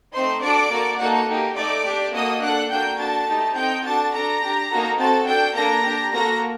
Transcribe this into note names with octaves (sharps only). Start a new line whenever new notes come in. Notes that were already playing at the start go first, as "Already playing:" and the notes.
A3 C4 D#4 C5 C6
D4 F#4 A4 D5 D6
A#3 F#4 A4
A#3 D#4 F#4 A4 F#5
A#3 D#4 G4
A3 D#4 A4 D5 D6
D4 G4
A#3 F#4 A4 D#5 D#6
D4 A4 F#5 F#6
A#3 D4 F#4 A4 G5 G6
D4 F#4 A4 A5 A6
A3 D#4 G4
C4 D#4 A4 G5 G6
D4 F#4 A4 A5 A6
D4 A4 A#5 A#6
D4 G4
A#3 D#4 F#4 A4
C4 F#4 A4 A5 A6
D4 A4 G5 G6
A#3 D4 A4 A#5 A#6
D4 G4
A#3 F#4 A4 A#5 A#6